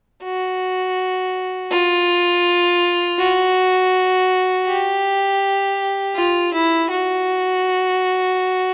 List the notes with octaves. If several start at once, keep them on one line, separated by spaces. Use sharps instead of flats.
F#4
F4
F#4
G4
F4
E4
F#4